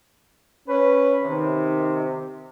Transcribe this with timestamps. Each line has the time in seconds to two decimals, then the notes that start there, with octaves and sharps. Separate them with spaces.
0.68 C#4 B4
1.23 C3 D#3